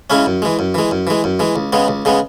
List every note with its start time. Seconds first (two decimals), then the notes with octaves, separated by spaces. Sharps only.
0.10 C#3 G#3 C#4 E4
0.26 F#2
0.42 E3 G#3
0.59 F#2
0.74 E3 G#3
0.91 F#2
1.07 E3 G#3
1.24 F#2
1.39 E3 G#3
1.56 C#2
1.73 C#3 G#3 B3
1.88 C#2
2.05 C#3 G#3 B3